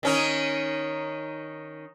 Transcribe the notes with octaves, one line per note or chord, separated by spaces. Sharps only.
D#3 C#4 D#4